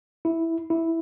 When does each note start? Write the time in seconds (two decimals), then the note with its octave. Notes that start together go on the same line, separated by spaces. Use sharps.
0.25 E4
0.70 E4